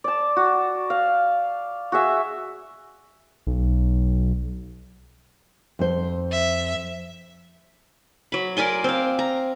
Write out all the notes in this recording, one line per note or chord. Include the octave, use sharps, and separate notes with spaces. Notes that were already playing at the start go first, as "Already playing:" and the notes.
D5 A5
F#4
F5
F#4 G#4 E5
B1
F2 C5
E5
F#3 B5
A#4 D5 G#5 C6
C4 F5
A#5